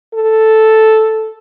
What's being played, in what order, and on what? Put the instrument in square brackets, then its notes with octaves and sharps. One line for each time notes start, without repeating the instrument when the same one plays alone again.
[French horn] A4